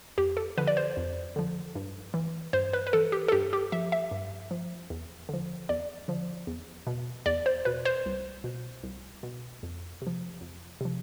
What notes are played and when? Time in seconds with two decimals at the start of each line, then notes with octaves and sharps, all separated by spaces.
0.18 F2 G4
0.37 A4
0.58 D3 F3 B4
0.67 D5
0.77 C5
0.97 F2
1.36 D3 F3
1.75 G2
2.14 E3
2.53 G2 C5
2.73 B4
2.87 B4
2.93 E3 A4
3.12 G4
3.28 A4
3.32 G2 G4
3.53 G4
3.72 F3 E5
3.92 E5
4.11 G2
4.51 F3
4.90 E2
5.29 D3 F3
5.69 E2 D5
6.08 D3 F3
6.47 E2
6.87 B2
7.26 E2 D5
7.46 C5
7.65 B2 B4
7.85 C5
8.06 C2
8.44 B2
8.83 C2
9.23 B2
9.63 F2
10.02 C3
10.07 F3
10.41 F2
10.81 C3 F3